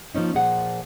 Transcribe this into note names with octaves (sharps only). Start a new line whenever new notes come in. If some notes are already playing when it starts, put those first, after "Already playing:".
F3 A#3 C#4 D#4
A#2 F3 G#4 F#5